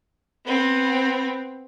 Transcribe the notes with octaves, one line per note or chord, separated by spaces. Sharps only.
B3 C4